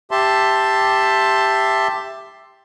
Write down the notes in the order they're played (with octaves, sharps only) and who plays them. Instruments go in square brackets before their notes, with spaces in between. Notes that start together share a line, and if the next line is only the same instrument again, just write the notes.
[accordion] G4 E5 A5 C6